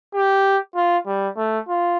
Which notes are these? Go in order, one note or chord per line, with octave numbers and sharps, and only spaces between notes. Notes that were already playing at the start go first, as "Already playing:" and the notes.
G4
F4
G3
A3
F4